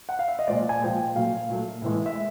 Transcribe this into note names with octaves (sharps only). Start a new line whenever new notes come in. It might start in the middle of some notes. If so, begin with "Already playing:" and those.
F#5
F5
E5
D#5
A#2 F3 G#3 D5
G#5
A#2 F3 G#3 G5
A#2 F#3 A3 F5
A#2 F#3 A3
A2 E3 G#3
E5
G#3